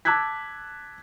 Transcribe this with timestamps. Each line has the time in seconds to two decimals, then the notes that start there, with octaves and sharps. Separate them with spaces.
0.05 A5 D6 E6 F#6 G#6 B6